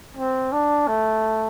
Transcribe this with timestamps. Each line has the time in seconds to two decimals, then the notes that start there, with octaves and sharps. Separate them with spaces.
0.17 C4
0.52 D4
0.88 A3